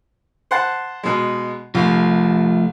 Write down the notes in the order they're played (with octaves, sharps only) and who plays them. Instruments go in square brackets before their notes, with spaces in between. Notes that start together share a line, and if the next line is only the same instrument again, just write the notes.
[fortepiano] C5 F#5 A5
B2 G#3
[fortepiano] C2 [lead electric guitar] F3 A3